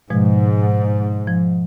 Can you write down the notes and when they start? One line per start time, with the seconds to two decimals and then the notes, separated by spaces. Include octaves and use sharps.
0.10 G#2 B2 F3 G#3
1.27 F3